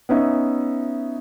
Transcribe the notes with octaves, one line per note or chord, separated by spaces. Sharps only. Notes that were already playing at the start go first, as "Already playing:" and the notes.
B3 C#4 D#4 E5